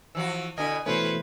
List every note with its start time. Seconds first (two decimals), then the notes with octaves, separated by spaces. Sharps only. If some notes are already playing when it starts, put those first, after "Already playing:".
0.15 E3 F3 F#4 E6
0.58 B2 D3 E4 D#5 G#5
0.86 B2 E3 A3 C#4 B4 C5